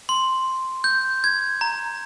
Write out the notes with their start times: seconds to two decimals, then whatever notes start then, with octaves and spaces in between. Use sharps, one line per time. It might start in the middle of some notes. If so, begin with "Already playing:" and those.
0.09 C6
0.84 G6
1.24 G#6
1.61 A#5